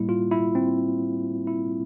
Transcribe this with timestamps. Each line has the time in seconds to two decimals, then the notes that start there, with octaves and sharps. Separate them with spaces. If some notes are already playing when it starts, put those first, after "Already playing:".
Already playing: A2 G3 A#3 E4
0.09 F4
0.31 E4
0.55 C4
1.47 E4